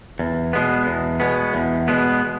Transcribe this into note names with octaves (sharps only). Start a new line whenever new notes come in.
E2
B2 G#3 B3
E2
B2 G#3 B3
E2
B2 G#3 B3